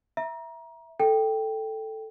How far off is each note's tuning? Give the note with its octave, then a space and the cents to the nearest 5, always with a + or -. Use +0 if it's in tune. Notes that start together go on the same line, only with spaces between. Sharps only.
E5 +0 A#5 +25
A4 +0 G5 +0